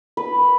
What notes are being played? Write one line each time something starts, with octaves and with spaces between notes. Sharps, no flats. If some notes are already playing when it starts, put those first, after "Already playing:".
B4